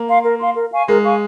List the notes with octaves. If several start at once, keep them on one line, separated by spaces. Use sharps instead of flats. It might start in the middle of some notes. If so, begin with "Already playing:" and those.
Already playing: A#3
F5 C6
A#4
F5 C6
A#4
F5 G#5 C#6
G#3 A#4
F5 G#5 C#6